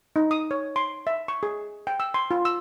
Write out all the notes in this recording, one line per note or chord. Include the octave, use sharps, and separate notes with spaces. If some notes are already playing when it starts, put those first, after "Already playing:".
D#4
D#6
C#5
C6
E5
C#6
G#4
G5
E6
C6
F4
E6